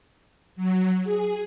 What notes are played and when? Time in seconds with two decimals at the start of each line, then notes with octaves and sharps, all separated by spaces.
0.56 F#3
1.04 G#4